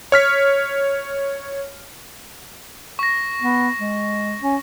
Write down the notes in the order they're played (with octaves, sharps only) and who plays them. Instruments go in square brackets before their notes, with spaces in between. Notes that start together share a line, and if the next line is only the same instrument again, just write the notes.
[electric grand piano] C#5 F6 B6
[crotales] C#6 A#6
[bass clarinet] B3
G#3
C#4